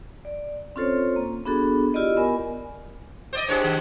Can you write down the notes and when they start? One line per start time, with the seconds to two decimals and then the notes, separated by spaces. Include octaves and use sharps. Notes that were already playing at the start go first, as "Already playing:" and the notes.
0.25 D5
0.76 C4 C#4 F4 A4 C5 C#5
1.16 A#3
1.45 B3 D4 F#4 G#4 A4
1.94 E4 F4 G4 D5 D#5
2.17 B3 A#4 G#5
3.33 C5 D5 D#5
3.48 D4 E4 G4 G#4 C5 C#5
3.64 D#3 G#3